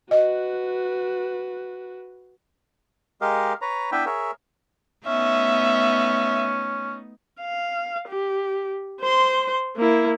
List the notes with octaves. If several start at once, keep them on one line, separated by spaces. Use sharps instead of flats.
F#4 B4 D#5
G#3 G4 A#4 D#5 F5
B4 C#5 A#5
B3 D4 E4 B4 E5 G5
G#4 A#4 C#5 E5
A3 B3 C#4 D#4 E5
F5
G4
C5 C6
A#3 E4